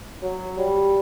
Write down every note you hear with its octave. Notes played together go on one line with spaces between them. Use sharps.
F#3
G3